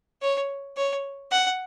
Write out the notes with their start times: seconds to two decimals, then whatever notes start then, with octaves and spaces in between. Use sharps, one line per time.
0.22 C#5
0.77 C#5
1.32 F#5